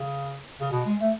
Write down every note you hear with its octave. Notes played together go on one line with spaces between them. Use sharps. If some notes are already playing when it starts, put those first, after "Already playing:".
Already playing: C#3
C#3
B2
G#3
A3